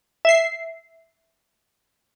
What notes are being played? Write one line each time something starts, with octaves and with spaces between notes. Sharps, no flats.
E5 C7